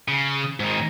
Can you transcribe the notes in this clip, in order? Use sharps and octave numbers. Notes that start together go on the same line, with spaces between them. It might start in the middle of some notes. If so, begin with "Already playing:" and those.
C#3
G#2 D#3